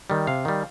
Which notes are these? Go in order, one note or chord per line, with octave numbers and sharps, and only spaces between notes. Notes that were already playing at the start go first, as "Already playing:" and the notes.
D#3 G3
C3 F5
D#3 G3